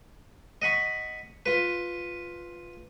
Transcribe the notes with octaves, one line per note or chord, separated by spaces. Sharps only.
D#5 F#5 B5 C#6
F4 B4